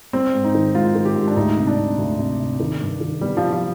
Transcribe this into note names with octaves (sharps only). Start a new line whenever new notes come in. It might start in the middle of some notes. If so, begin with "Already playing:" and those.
G3 C4
G#2
D#4
D#3
G#2 F4
D#3
G4
G#2
D4
D2 D#4
C3
D4
C3
D2
C3
C3
D#3
G2
D#3
G3 B3
F3 D4
F3